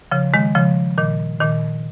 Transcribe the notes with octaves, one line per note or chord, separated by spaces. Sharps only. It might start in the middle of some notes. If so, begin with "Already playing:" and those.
C#3 F3
D#3 G#3
C#3 F3
A#2 D#3
A#2 D#3